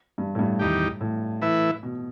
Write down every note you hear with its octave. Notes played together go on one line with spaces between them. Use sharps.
G2
A2
G2
E2 D#3 G3 D#4 G4
A2
E3 A3 E4 B4 E5
B2